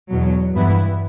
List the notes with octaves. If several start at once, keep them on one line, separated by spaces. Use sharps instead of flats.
E2 B2 F#3
G2 E3 B3 E4